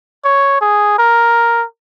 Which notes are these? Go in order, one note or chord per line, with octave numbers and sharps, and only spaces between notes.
C#5
G#4
A#4